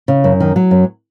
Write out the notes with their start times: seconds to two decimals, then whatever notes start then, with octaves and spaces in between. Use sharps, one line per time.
0.08 C#3
0.24 F#2
0.40 D#3
0.56 F#3
0.71 F#2